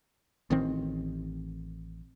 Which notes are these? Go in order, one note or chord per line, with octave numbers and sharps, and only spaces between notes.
A1 D#3 C4